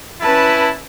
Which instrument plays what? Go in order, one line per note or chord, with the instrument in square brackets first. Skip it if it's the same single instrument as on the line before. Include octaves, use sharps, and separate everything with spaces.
[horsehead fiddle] C#4 B4 [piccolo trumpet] E4 [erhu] A5